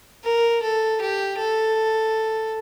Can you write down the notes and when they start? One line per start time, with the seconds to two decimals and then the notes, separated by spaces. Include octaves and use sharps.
0.24 A#4
0.62 A4
1.01 G4
1.38 A4